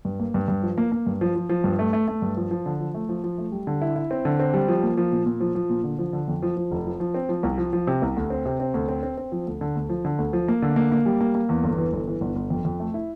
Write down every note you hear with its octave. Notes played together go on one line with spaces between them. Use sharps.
G2
A#3
G2
G2
F3
A#3
A#3
G2
F3
F3
F3
G2
A3
A3
A3
G2
F3
F3
D3
F3
A3
F3
F3
A3
G3
D3
E4
E4
C4
D3
C4
G3
F3
A#3
F3
A#2
A#2
F3
F3
A#2
D3
F3
D3
F2
F3
F3
F1
F3
F3
C4
F3
C2
F3
F3
C3
C2
D2
C4
C3
C4
D2
C4
C4
C4
F3
D2
D3
D2
F3
D3
D2
F3
A#3
D3
A#3
A#3
G3
A#3
A#3
E2
G1
E3
G1
E3
G1
G1
F2
F2
A3
E4